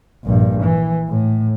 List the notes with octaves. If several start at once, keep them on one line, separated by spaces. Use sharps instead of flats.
A#1 G2
E3
A2